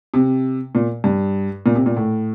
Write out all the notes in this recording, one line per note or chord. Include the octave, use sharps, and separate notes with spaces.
C3
A#2
G2
A#2
C3
A#2
A2